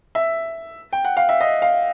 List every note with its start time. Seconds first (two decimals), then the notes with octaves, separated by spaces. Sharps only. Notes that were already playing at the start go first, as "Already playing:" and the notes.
0.15 E5
0.93 G5
1.05 F#5
1.17 F5
1.29 E5
1.41 D#5
1.62 F5